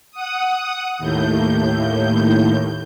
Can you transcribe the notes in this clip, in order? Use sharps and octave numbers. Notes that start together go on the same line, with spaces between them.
F#5 D#6
D#2 A2 G6